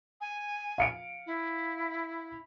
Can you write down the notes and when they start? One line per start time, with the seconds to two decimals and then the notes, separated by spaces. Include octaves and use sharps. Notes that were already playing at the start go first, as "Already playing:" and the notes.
0.21 G#5
0.78 F5 C#7 D7
1.26 E4